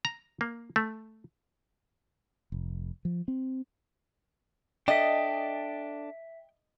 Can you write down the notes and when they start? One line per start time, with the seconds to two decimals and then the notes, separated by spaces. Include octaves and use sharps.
0.05 A#5
0.41 A#3
0.76 A3
2.52 F1
3.05 F3
3.28 C4
4.88 D4 A4 D#5 E5 G5 B6